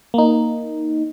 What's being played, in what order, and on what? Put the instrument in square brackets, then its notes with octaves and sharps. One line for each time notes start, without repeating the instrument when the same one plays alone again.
[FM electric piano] A#3 D#4